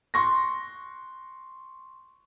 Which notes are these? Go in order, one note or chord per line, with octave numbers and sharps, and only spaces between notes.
C6 C#6 A#6